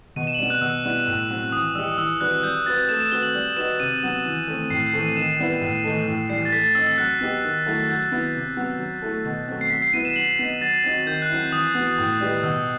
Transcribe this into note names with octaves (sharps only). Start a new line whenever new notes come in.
B2 D#7
E7
F#7
G3 B3 E7
F#6
B2 E6
G3 B3 E4
A2
F#3 C4
E3 D#6
G3 D#4 G4 E6
E3 E6
G3 C4 F#4 B4 F#6
G3 G6
C4 F#4 B4 A6
A3 E7
E7
C4 F#4 B4 G7
F#7
G3 F#7
D#4 F#4 B4 E7
C3 D#7
F#3 B3
E3
A3 C4
A2 C7
C7
E3 A3 C4
D#7
D#3 E7
G3 B3 E4 B4
A2
E3 A3 D#4 A4
A2
E3 G3 C7
A6
A3 B6
A6
C4 D#4 E6
E6
F#3 F#6
B3 D#4 G4
D#3
F#3 A3 E4
F#3 G6
B3 E4
C3
F#3 B3
F#3
A3 E4 A4
B2
F#3 A3 C4
C7
F#3 B6
C7
B3 E4 B4 D#7
E7
F#3 F#7
B3 D#4 B6
F#3 A6
C4 D#4 F#4
D#3 G6
F#6
F#3 C4 E4
E3 D#6
B3 F#4
A2
G3 D#4 G4 B4
B2 E6